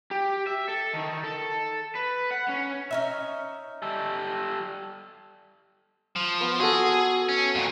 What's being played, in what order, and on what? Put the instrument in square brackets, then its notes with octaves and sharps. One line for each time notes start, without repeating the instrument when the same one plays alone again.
[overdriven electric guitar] G4
E5
A4
D#3
A4
B4
F#5
C#4
[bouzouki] C#4 D#4 E5
[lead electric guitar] G3 A4
F3
[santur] B3
[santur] F#4 A4 [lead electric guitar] G#4
[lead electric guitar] C#4
[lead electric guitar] F2 A#2 [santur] F#5